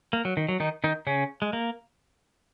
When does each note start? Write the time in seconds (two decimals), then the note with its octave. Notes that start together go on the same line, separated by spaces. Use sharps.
0.13 A#3
0.25 F#3
0.37 D#3
0.48 F#3
0.60 D#3 D#4
0.84 D#3 D#4
1.07 C#3 C#4
1.42 G#3
1.53 A#3